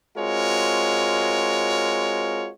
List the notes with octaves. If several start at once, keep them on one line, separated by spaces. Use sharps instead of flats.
G#3 C4 F4 F#4 A#4 C#5